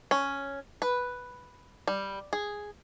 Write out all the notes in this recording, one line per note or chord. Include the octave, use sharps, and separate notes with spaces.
C#4
B4
G3
G#4